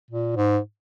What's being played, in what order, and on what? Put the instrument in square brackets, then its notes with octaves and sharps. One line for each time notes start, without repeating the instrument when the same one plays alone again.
[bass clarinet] A#2
G#2